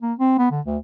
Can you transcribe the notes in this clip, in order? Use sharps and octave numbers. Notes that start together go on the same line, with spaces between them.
A#3
C4
B3
D3
D2